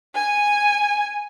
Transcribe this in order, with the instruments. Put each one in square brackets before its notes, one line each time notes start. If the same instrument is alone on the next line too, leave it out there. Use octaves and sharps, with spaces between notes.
[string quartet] G#5